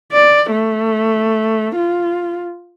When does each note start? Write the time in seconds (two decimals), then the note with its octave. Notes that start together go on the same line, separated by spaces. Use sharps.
0.13 D5
0.51 A3
1.76 F4